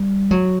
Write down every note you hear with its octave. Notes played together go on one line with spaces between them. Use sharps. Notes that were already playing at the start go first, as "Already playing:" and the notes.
Already playing: G3
F#3